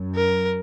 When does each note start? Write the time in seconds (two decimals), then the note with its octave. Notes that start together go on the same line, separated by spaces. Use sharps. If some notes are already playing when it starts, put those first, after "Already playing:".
Already playing: F#2
0.15 A#4